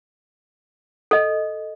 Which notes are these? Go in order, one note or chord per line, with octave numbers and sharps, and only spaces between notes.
A4 D#5